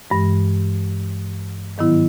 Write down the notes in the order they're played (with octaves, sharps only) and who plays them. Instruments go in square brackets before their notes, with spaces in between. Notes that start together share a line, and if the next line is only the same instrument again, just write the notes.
[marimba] G2 E3 G#3
G#2 D#3 F#3 B3 E4